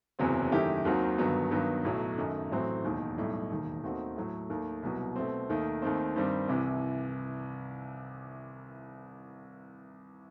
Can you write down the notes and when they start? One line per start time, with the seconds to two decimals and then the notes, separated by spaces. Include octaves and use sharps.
0.19 F#1 E2 C3 F#3 C4
0.51 F#2 D#3 A3 E4 G4
0.85 D#2 D#3 F#3 C4 F#4
1.18 G1 G2 D#3 F#3 B3
1.51 G2 D#3 F#3 B3
1.84 B1 A2 F#3
2.18 F#2 D#3 A3 D#4
2.51 A1 A2 F#3 C4
2.84 E1 D#2 D#3
3.17 B1 A2 G3 D#4
3.51 E1 D#2 D#3
3.83 D#2 D#3 A3 C4 F#4
4.16 A2 F#3 A3
4.49 D#2 D#3 A3
4.83 C2 B2 F#3
5.16 B2 A3 C4
5.49 D#2 D#3 A3
5.82 D#2 D#3 A3 C4
6.16 G2 D#3 G3 C4
6.48 C2 C3 E3